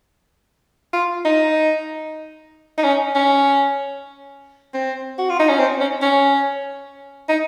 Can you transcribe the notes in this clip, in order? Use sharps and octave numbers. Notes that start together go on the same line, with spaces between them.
F4
D#4
D#4
C#4
C#4
C4
F#4
F4
D#4
C#4
C4
C#4
C#4
D#4